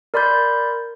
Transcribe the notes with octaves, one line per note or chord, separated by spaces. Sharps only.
A#4 D5 B5 C6 G6